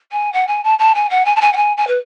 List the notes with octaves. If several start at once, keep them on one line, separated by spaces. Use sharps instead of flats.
G#5
F#5
G#5
A5
A5
G#5
F#5
G#5
A5
G#5
F#5
G#5
G#5
B4